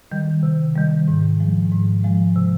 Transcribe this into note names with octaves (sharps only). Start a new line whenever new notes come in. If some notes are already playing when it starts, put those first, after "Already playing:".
D#3 G3
C3
D#3 G3
G#2
F3 G#3
G#2
F3 G#3
C3